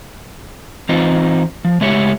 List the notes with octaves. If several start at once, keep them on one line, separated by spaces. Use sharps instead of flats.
E3 C4 D#4 F4 C5
F3
C#3 G#3 A3 E4 G4 C#5